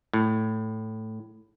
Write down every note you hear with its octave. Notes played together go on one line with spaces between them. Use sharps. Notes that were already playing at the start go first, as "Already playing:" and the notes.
A2